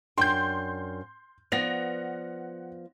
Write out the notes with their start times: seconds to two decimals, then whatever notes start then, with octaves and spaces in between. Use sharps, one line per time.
0.18 F#2 D4 G5 C6 G6
1.52 F3 B3 D5 F#5 A#6 F7